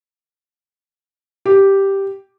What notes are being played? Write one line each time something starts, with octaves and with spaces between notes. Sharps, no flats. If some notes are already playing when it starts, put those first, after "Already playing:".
G4